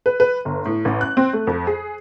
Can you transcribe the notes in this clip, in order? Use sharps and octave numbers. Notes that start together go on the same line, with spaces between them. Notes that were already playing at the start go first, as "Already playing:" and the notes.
B4
B4
G1
A2
A1
F#6
C4
A3
F2
G#4